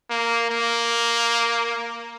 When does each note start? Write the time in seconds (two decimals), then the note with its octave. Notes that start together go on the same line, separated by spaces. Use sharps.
0.10 A#3
0.50 A#3